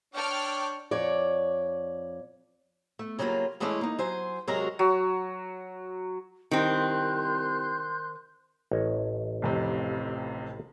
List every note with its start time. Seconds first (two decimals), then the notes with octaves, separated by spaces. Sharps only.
0.14 D4 C#5 G5 A5 F6
0.91 F2 C#5 D5
2.99 A3
3.19 C#3 F#3 G3 A#3 B3 F4
3.60 E3 G#3 A3 C#4 D4 E4
3.81 A#3 D#4
3.99 F#3 C5 G#5
4.47 C3 F#3 G#3 F#4 A#4 A#5
4.79 F#3
6.51 C2 D#3 C4 C6 F#6 G6
8.71 A1 C#5 D#5
9.42 F1 F2 C3